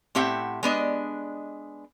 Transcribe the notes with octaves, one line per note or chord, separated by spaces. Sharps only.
A2 C4 G4 E5 F#5
G#3 B3 D4 D#5